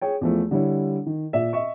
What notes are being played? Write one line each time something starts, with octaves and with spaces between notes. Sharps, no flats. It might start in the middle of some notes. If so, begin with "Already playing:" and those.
G#4 C#5 G5
E2 F3 A3
D3 G3 E4 C#5
D#3
A#2 D5 E5
D#5 E5 C#6